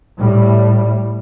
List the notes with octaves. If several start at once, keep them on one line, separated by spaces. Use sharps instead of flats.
A2 G3